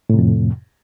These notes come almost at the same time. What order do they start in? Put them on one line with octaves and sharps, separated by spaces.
A2 C3 F2